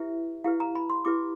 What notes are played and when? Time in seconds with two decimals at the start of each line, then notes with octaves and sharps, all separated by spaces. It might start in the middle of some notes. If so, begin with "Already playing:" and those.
Already playing: E4 G4 B4 E5
0.44 E4 G4 B4 F5
0.60 A#5
0.75 B5
0.90 C6
1.05 E4 G4 B4 D6